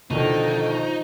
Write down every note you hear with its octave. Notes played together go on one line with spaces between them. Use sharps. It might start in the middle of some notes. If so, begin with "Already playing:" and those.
B2 D3 D#3 F3 D#4